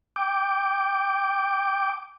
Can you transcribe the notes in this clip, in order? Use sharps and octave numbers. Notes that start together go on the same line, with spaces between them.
G5 D6